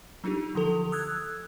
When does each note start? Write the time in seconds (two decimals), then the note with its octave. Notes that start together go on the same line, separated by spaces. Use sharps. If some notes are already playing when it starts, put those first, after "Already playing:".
0.24 F#3 D4 D#4 F4 G4
0.55 D3 F3 A4 F7
0.92 D#6 E6 F#6 G#6